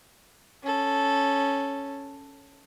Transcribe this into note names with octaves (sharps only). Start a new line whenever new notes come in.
C#4 A4